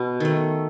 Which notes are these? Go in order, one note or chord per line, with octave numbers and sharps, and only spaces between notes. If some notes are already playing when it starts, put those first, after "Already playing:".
Already playing: B2 B3
D#3 A3